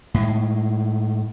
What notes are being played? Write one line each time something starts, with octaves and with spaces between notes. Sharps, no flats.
A2 G#3